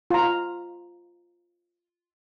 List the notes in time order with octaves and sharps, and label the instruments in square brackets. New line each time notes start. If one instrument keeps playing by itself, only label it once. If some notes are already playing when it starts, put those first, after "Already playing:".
[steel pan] F4 A#5